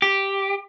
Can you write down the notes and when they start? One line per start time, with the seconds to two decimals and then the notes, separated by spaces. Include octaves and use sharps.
0.02 G4